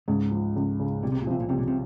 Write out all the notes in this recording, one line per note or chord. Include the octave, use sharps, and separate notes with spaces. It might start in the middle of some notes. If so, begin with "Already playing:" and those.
C#2 G#2
F3
C#2
C#3
C2 A#2
C3
A#2
C3 F3
A#2
C2 C3
A#2
C3